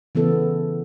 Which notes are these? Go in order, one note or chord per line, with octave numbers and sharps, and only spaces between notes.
C#3 E3 B3 A4